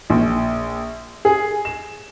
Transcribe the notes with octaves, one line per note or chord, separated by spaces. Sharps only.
A#1
G#4
E7